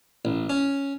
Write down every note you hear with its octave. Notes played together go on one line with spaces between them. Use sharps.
A1
C#4